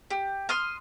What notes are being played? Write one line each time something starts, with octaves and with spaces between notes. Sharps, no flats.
G4
C6 D#6 F6